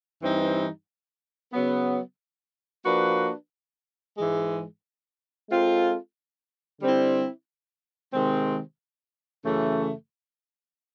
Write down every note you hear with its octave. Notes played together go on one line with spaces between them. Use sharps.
G2 E3 G3 C4 D#4
C#3 F#3 B3
F3 A#3 D4 F#4 B4
G#2 E3 G#3
G#3 C4 F4 A4
D3 G3 C4 E4
C3 D#3 G#3 C4
F#2 C#3 E3 A3